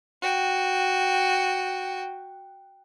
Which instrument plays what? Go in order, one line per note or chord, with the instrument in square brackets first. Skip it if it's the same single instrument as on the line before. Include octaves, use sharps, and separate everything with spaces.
[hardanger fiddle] F#4 G5